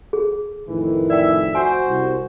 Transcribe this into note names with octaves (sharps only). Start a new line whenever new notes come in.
G#4
F2 A2 D#3 E3
D5 E5 G5
F#4 C5 G#5
C2